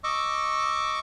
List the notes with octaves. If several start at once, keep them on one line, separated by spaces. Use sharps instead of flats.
D#5 C#6 D6 E6